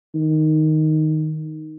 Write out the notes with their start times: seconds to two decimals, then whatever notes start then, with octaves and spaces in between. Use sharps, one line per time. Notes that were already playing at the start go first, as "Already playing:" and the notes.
0.15 D#3